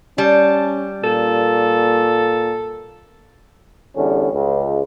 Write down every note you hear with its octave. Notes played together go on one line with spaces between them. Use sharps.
G3 C#4 A5
A#2 A4
E2 D3 G3 C#4
C#2